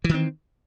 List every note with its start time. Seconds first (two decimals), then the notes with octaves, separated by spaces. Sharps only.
0.04 E3
0.09 D#3
0.14 C4